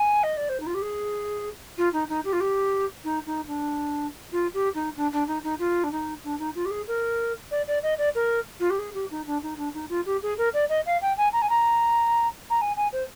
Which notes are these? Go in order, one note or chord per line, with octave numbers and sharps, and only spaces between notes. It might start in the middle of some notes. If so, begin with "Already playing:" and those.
Already playing: G#5
D#5
D5
C5
D#4
F4
G4
G#4
F4
D#4
D#4
G4
F4
G4
D#4
D#4
D4
F4
G4
D#4
D4
D4
D#4
D#4
F4
D4
D#4
D4
D#4
F4
G4
G#4
A#4
D5
D5
D#5
D5
A#4
F4
G4
G#4
G4
D#4
D4
D#4
D4
D#4
F4
G4
G#4
A#4
D5
D#5
F5
G5
G#5
A#5
G#5
A#5
A#5
G#5
G#5
C5